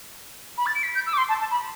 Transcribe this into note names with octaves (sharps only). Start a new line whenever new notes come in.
B5
A6
D7
B6
G6
E6
D6
C6
A5
A5
B5